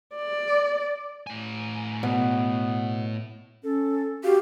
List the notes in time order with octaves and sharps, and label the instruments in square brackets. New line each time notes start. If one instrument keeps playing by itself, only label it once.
[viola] D5
[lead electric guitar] A2 G#5
[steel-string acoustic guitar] B2 [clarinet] B3
[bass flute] C#4 [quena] A4
[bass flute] F#4 [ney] G4 [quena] F5